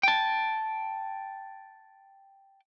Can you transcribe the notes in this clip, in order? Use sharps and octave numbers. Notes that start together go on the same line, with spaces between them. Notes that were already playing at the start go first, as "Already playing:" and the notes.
G5 A5